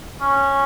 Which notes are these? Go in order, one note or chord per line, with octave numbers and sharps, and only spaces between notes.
C#4